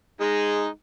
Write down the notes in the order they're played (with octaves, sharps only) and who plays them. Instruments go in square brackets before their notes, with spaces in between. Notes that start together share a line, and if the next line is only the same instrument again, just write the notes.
[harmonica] G#3 D#4